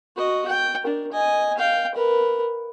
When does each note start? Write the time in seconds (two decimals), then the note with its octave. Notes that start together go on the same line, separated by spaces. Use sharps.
0.17 F#4 D#5
0.48 G5
0.82 D4 A#4
1.12 D#5 G#5
1.58 F5 G5
1.95 A#4 B4